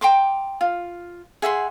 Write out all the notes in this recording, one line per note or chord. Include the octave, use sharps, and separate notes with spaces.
G5 A#5 C6 D6
F4
G#4 E5 F#5 C6